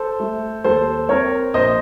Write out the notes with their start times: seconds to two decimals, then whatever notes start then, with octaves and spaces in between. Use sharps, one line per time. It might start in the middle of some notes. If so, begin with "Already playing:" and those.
Already playing: A4 C5
0.20 A3
0.64 D#2 A4 C5
1.09 C4 A#4 C#5
1.54 A#1 C5 D#5